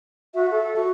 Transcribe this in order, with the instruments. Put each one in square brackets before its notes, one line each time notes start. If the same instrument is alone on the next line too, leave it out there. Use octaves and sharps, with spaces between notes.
[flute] F#4 [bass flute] E5
[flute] A4
[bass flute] F#4